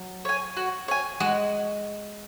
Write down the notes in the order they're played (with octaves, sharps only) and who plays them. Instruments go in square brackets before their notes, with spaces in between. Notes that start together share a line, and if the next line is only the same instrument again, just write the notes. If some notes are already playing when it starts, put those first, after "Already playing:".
Already playing: [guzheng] F#3
[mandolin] C#5 G#5
F#4
C#5 G#5
[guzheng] G#3 [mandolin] F#4